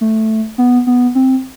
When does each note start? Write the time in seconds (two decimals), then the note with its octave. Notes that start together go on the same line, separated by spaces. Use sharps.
0.01 A3
0.58 B3
0.87 B3
1.15 C4